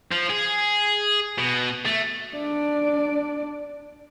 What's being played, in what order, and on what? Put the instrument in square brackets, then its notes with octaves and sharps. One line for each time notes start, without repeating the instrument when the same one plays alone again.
[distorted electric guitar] F3
G#4
B2
A3
[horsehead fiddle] D4 D5